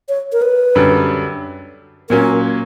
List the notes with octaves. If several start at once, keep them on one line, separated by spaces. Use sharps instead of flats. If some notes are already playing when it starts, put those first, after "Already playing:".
C#5
A#4
B4
F#2 D3 G3
A#2 F#3 C#4 A#4